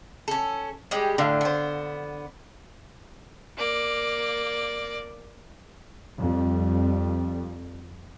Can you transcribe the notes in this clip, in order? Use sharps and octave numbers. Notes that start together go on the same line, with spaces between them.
C#4 A4
G3 G#3 G4
A2 D3 F5
B3 C5
A#3 D5
F2 G3